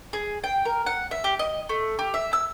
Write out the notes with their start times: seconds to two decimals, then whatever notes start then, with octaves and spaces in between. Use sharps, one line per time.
0.13 G#4
0.44 G5
0.65 A#4
0.86 F#5
1.11 E5
1.24 G4
1.39 D#5
1.69 A3
1.99 G4
2.14 E5
2.33 E6